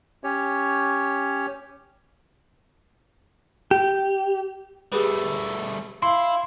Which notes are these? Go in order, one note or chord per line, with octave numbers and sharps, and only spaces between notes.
C#4 G4 C#5
G4
G3 A3 G4 G#4 B4
E4 F5 C6